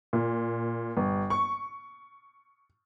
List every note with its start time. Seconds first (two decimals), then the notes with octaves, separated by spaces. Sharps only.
0.13 A#2
0.97 G1
1.30 C#6